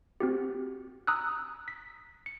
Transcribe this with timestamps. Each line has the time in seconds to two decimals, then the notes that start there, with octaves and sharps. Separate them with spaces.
0.20 C4 F#4 G4
1.07 A#5 D#6 E6 F#6
1.68 B6
2.26 C#7